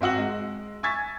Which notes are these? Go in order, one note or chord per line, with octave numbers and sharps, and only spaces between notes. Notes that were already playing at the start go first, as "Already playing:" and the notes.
G#1 C4 F#4 E6 F#7
G#3
G#5 C#6 E6 G#6 A6 B6